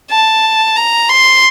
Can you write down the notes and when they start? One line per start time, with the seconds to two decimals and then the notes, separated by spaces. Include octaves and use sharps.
0.10 A5
0.77 A#5
1.09 C6